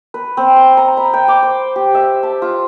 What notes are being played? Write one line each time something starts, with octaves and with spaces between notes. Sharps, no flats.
B4
C4
C6
A#5
B5
G5
D6
C5
G4
E5
A5
F4